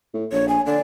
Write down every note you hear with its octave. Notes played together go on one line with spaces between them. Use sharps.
A2
A#1 C#5
G#5
D3 D5